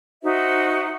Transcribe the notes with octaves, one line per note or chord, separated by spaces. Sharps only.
D#4 F#4 C5 E5